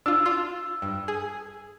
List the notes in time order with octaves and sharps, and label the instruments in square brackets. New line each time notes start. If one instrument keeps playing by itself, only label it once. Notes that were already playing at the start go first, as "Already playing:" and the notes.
[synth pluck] D4 F4 [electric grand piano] E6
[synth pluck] F4
G2
G#4